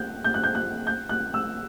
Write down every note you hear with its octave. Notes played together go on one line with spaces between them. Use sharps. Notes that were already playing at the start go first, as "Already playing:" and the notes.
Already playing: F#6 G6
G6
F#6
G6
F#6
G6
F#6
E6